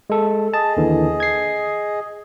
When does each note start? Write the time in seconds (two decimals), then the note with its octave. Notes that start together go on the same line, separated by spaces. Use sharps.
0.10 G#3 A4
0.54 G#4 D#5 A5
0.77 D#2 D3 E3
1.20 G#6 C7